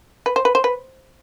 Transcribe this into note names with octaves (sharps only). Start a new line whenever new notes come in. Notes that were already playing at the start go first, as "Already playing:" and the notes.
B4
C5
B4
C5
B4